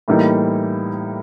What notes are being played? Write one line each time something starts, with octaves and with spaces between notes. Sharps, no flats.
A2 E3 G3 A#3 D#4